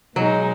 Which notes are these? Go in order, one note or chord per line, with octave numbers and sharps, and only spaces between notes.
B2 F#3 G#3 D#4